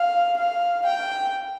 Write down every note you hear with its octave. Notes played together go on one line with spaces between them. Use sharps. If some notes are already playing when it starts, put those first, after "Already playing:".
Already playing: F5
F5
G5